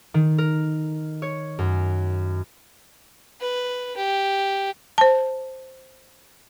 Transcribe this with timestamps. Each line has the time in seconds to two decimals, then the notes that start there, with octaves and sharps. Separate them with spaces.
0.14 D#3
0.38 A#4
1.22 C#5
1.59 F#2
3.41 B4
3.97 G4
4.98 C5 A5